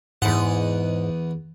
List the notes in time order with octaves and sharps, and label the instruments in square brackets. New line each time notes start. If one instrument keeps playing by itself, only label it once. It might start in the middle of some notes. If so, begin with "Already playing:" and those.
[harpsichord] E2 F#5 [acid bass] G#2